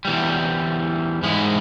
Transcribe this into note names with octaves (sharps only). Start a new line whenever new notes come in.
E2 E3 G3
G#2 E3 G#3 E4